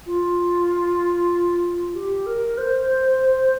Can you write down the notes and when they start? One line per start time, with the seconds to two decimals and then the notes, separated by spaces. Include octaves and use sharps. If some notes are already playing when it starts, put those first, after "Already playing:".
0.06 F4
1.95 G4
2.26 A#4
2.58 C5